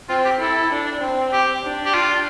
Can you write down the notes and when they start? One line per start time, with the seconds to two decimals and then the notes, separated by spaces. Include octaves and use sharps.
0.09 C4 F4
0.25 G4
0.40 E4 A4
0.71 D4
1.01 C4
1.32 G4
1.63 D4
1.85 G4
1.94 F4